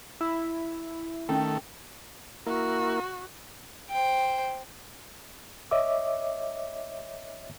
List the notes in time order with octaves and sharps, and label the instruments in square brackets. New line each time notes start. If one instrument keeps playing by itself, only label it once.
[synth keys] E4
[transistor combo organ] D#3 A3 A4 [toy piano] C#4 G5
[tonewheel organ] A#3 E4 A#4 [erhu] F#4
[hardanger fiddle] C5 G5
[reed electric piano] C#5 D#5 E5 D6